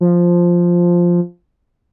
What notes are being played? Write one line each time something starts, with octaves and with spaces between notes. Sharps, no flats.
F3